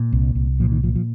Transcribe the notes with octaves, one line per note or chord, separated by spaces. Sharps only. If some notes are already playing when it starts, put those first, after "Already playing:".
Already playing: A#2
C2
C2
A#2 F3
D#3
A#2 F3
F3